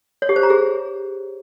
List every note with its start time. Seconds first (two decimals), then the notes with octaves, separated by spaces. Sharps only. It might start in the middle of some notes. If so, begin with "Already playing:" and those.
0.22 C#5
0.29 G4
0.36 C5
0.43 A#5
0.50 G#4